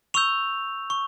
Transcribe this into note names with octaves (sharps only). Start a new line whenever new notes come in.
C#6 E6 G6 F7
C#6